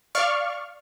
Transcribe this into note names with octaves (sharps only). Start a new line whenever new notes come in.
D5 F5 C#6 F6